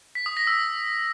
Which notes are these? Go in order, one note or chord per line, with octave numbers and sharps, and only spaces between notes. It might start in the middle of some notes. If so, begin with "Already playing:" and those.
B6
D#6
A#6
E6